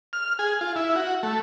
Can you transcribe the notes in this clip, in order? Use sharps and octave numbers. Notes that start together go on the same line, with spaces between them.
F6
G#4
F4
E4
F#4
A3